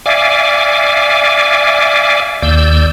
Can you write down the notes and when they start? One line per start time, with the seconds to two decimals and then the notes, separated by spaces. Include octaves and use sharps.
0.06 D5 E5 F5 G#5 D6
2.42 D#2 D5 E6 G6